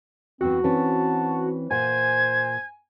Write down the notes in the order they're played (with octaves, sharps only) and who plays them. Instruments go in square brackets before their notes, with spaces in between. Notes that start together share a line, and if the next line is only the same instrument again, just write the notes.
[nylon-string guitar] E2 E3 [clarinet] C4 [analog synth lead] F#4
[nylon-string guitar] E3 C4 C#4 [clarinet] A5
[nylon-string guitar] A#2 F#5 [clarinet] C5 [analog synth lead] G#5 [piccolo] G#6